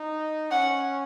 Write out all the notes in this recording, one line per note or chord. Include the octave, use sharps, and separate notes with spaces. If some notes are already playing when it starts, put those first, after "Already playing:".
Already playing: D#4
C#4 F#5